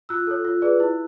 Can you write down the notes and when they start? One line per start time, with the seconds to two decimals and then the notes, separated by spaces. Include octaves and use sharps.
0.09 F4 E6 F#6
0.27 A4 C#5
0.45 F4
0.62 G#4 B4 D5
0.80 E4